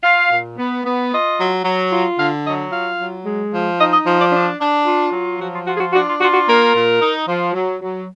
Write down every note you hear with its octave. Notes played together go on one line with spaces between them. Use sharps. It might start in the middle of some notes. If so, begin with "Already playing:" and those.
F4 F5
A#2
B3
B3
F4 D#5
F#3
F#3
F4
D3 F5
F#3 D#5
F4 F5
F#3
G#3
F3
D#4 D#5
D#5
F3
D5
D4
D4
F4
F#3
F3 F#4
F4
F4 F#4
G#4
F#4
D4 F#4
F4
F4 F#4
F#4
A#3 A#4
A#2
D#4
F3
F#3
F#3